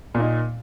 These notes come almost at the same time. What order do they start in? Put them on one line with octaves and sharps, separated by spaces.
A#2 A#3 D#4